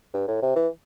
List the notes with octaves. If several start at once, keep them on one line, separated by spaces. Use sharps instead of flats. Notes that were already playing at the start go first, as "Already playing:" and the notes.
G2
A2
C3
E3